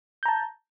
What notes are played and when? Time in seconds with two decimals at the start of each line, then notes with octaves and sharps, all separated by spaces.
0.23 G6
0.26 A#5
0.28 A5